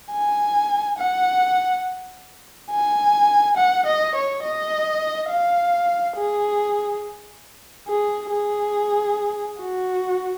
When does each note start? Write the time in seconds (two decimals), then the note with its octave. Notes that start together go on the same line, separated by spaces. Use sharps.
0.12 G#5
0.98 F#5
2.71 G#5
3.57 F#5
3.87 D#5
4.15 C#5
4.43 D#5
5.30 F5
6.17 G#4
7.88 G#4
8.31 G#4
9.61 F#4